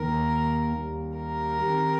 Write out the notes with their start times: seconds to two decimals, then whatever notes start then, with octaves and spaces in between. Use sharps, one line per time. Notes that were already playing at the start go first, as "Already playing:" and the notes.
Already playing: D#2 D#3 A#3 D#4 A#4
0.73 D#2 D#3 G3 D#4 G4
1.15 A#4
1.59 D#3 C4 D#4 G4